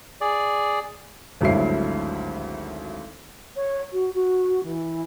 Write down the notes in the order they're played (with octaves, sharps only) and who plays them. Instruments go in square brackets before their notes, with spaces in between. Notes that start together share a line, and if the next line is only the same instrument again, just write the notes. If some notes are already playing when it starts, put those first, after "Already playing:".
[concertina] G#4 D5
[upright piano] G#1 D2 G2 F#3 E4 C7
[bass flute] C#5
F#4
F#4
E3